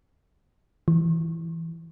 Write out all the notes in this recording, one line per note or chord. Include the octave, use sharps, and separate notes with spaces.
E3